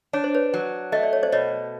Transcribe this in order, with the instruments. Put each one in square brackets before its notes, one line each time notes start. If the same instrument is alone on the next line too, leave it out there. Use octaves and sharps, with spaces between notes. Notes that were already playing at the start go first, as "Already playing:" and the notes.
[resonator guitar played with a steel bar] D4 [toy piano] C#5
[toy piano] C5
B4 C#5
[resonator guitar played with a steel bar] F#3
[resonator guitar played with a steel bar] A3 [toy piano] D#5
[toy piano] D5
C#5
C5 D5
[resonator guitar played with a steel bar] B2 [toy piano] C#5 D#5